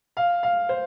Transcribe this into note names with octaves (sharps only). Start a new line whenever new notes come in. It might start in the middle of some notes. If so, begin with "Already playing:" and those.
F5
F5
C5